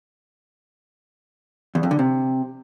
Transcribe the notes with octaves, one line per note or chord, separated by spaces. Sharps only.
E2
F2
D3
C3